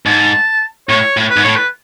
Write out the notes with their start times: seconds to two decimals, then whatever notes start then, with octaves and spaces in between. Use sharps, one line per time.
0.06 G#2 A5
0.89 A2 C#5
1.17 A2
1.30 B4
1.37 G#2
1.44 A2 C#5
1.56 B4